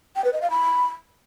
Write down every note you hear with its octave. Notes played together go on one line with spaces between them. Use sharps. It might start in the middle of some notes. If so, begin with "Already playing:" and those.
G5
B4
D#5
F5
B5